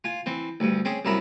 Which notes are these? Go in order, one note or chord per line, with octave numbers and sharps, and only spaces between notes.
F4 G#5
E3 C4
D2 G2
C4 C#4 G#4
C2 F#2 E4 A#4 E5 B5